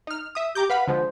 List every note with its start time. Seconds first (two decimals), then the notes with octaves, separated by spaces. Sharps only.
0.07 D#4 F6
0.35 E5 D#6
0.55 G4 A#5 D6 G6
0.70 B4 F5 F#5 B5
0.87 D3 F3 G#3 C5